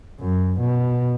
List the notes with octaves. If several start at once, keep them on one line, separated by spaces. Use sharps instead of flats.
F#2
B2